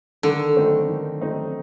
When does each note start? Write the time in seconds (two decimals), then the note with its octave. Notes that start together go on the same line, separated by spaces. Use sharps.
0.23 D3 D#3
0.57 A3 C4 D#4
0.89 D#3
1.21 A3 C4 D#4